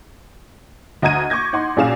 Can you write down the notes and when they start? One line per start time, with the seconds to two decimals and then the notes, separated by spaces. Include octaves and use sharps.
1.02 D2 D#5 E5 A#5 G#6 D#7
1.30 C#6 D6 G6 G#6 A#6
1.53 D#4 F#5 C6
1.76 B1 A#2 C#4 G#4 F5 E7